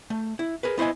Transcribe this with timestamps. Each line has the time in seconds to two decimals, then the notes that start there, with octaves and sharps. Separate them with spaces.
0.10 A3
0.39 E4
0.63 G#4 A#4 B4
0.78 B3 E4 C5 D#5 G#5